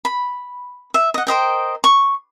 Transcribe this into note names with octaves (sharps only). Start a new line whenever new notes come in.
B5
E5
D#5 F#5
A#4 C5 D#5 G5
C#6